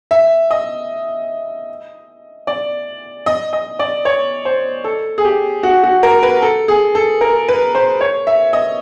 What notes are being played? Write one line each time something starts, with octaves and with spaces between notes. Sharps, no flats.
E5
D#5
D5
D#5
D#5
D5
C#5
C5
A4
G#4
G4
F#4
F#4
A#4
B4
A4
G#4
A4
A#4
B4
C5
C#5
E5
D#5